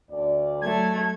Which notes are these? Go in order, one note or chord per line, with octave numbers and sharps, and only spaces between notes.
D2 D5
F#3 A3 G#6